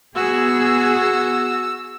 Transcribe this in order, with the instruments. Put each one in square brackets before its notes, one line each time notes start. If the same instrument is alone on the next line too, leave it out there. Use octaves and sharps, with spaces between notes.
[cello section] B3 G#4 [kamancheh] F#4 [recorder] E6